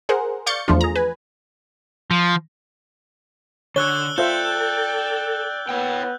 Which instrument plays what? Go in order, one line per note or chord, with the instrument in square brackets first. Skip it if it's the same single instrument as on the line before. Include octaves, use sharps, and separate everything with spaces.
[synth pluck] G#4 A#4 C5 F#5
D5 F5 C#6 G6 A6 C#7
E2 F3 A3 D4 F4
G#4 A#5
B4 G#5
[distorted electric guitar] F3
[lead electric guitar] D3 [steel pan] C#5 [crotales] E6 F#6 G7
[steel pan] F4 C5 E5 [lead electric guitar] A4 [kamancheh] D5 G5 [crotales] G6
[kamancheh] B3 [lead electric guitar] C#5 G5